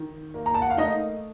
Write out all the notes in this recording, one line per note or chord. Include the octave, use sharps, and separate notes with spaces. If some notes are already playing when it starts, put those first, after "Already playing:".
Already playing: D#3
A#3
A#5
A5
F#5
F5
A3 D#4 D#5